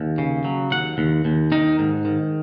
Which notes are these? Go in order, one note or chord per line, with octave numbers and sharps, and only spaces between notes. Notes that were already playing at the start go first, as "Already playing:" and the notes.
Already playing: D#2
C#3
F#3
D#2 F#5
D#2
D#2
D#3 D#4
G#2
D#3